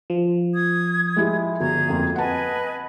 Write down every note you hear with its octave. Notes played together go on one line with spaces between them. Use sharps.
F3
D#6 G#6
G#3 E4 G4
G1 F#4 G#4 A#5 G#6
F2 A#3
B4 D#5 F#5 G#5 A5